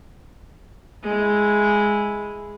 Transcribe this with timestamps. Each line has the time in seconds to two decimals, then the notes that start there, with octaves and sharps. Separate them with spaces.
1.03 G#3 E4